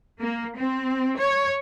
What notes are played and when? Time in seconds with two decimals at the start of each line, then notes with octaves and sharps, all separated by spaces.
0.19 A#3
0.56 C4
1.18 C#5